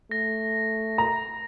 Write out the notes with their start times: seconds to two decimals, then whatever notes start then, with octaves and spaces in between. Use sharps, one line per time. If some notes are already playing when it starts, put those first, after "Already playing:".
0.11 A3 A#6
0.98 A#5